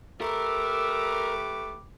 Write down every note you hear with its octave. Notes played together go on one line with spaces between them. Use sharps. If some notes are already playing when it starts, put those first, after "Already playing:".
A3 G4 A#4 B4 D6 E6